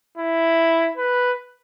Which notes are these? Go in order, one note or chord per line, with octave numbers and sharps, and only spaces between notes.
E4
B4